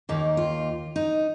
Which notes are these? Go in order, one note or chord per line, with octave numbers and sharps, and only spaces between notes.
D#2 D#3 A#3 D#4
F4
D#4